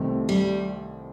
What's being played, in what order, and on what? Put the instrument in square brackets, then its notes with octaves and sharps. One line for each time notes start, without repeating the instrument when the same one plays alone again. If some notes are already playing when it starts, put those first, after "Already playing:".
Already playing: [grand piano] C2 C3 D#3 A3 C4
[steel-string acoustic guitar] G3